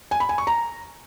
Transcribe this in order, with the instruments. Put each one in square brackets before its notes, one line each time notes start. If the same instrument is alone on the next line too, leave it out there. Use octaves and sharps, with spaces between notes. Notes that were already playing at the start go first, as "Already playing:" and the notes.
[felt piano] G#5
B5
G#5
C#6
A#5